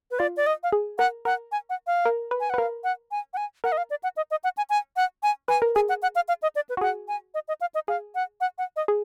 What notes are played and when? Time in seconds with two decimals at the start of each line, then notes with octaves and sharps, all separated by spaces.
0.11 B4
0.19 F4 D5
0.37 D5
0.46 D#5
0.63 F5
0.72 G#4
0.98 A#4 F#5
1.25 A#4 F#5
1.52 G#5
1.70 F#5
1.87 F5
2.05 A#4
2.31 B4
2.40 G#5
2.50 F#5
2.54 B4
2.58 A#4 F5
2.84 F#5
3.11 G#5
3.34 F#5
3.37 G#5
3.64 A#4 F#5
3.72 D#5
3.77 F5
3.90 D5
4.03 F#5
4.17 D#5
4.31 D#5
4.44 F#5
4.57 G#5
4.70 G#5
4.96 F#5
5.23 G#5
5.48 B4 G#5
5.62 A#4
5.75 G#4 G#5
5.89 F#5
6.02 F#5
6.15 F5
6.28 F5
6.42 D#5
6.55 D5
6.69 B4
6.77 F#4
6.81 G#4 F#5
7.08 G#5
7.34 D#5
7.48 D#5
7.61 F5
7.75 D#5
7.88 G#4 F5
8.15 F#5
8.41 F#5
8.58 F#5
8.76 D#5
8.88 G#4